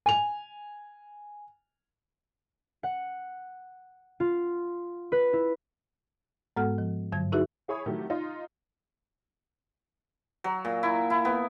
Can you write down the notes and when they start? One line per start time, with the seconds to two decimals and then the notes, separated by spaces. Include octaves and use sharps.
0.06 G#5 F7
2.83 F#5
4.20 F4
5.12 B4
5.33 E4
6.56 G#2 G#3 B3 A4 F#5 F6
6.78 F3
7.12 G2 D3 F#3 G#6
7.32 D#4 E4 F#4 G#4 B4 E5
7.68 E4 G#4 C#5 B5 D#6
7.86 C3 D#3 F#3 A3 E4 G4
8.10 D#4 F4 C6
10.44 F#3
10.65 A#2
10.83 E4
11.10 E4
11.25 B3